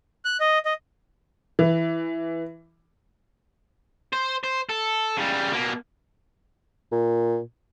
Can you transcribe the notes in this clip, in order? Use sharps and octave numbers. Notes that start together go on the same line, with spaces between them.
F#6
D#5
D#5
E3
C5
C5
A4
C#3 G3
B2 A#3
A#2